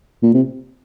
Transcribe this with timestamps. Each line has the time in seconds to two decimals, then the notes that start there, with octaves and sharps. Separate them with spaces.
0.23 A#2
0.34 C3